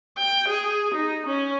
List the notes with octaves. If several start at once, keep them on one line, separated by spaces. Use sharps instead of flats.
G5
G#4
D#4
C#4